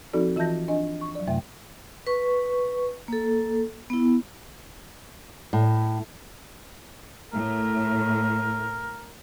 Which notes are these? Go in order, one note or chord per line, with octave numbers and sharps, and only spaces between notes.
F3 C4 D#4 F#4 A4 D5
E3 F4 E5 A5 G6 A#6
D4 D#5 G#5
C#6
F#3 D5
F#2 C3 A3 E5 G5
B4 C#6
A#3 A4
B3 E4
A2
A2 A#4